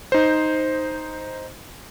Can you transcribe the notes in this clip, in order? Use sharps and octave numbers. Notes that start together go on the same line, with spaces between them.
D#4 C5